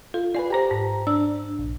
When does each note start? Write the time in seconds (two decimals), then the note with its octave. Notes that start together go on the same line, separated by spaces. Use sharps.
0.14 F4 A4
0.35 F4 B4 D5 G#5
0.50 G4 C5 G#5 A#5
0.71 G#2
1.07 D4 E6
1.59 A#1